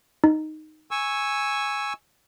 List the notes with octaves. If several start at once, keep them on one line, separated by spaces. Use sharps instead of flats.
D#4
G#5 C#6 E6